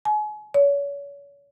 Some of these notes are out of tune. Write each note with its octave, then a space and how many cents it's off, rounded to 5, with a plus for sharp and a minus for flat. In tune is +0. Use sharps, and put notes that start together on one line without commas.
G#5 +35
C#5 +35